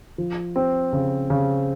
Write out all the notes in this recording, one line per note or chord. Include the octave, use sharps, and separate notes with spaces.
F3
C4
C#3
C#3